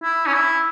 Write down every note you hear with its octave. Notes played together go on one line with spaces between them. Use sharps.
E4
C#4
E4